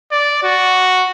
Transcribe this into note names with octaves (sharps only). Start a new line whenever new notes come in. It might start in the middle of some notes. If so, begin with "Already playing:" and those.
D5
F#4